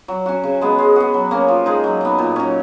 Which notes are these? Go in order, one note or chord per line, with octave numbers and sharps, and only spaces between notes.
F#3
C#4 F#4
C#3
G#3 B3
G#3
B3 F#4
F#3
A#3 C#4
F3
G#3 D#4
F#3
B3 D#4
A#2
F#3 C#4